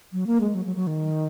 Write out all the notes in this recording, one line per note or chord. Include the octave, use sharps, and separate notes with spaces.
F#3
A#3
G#3
F#3
F#3
F#3
D#3